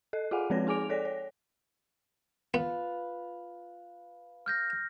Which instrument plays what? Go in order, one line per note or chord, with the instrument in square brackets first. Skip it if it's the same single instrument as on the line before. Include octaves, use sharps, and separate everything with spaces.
[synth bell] A4 D#5
F4 G#4 F5 F#5 G#5
F3 G#3 C4 B4 C#5 A#6
D#4 G#4 G#5 D6 D7 F7
A4 C#5 D5 A#6
C#5
[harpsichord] B3 [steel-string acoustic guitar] F4 B4
[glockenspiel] F6 G6 A#6